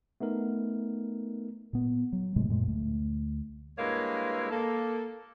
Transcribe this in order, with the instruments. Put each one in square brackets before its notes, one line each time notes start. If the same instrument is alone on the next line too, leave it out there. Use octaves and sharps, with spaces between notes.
[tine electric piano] A3 B3 D#4 A#4
[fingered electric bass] A#2 B3
F#3
G#2 C3 G#3 A3
F#2 A#2 G#3
D2 A3
[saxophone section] G2 G#3 A#3 E4 B4 C#5
A#3 A4